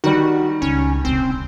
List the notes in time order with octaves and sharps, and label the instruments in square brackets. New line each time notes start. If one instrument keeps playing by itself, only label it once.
[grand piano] D#3 G3 [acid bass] F#4
[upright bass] C#2 [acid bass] C#4
[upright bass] D#1 C2 [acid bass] C4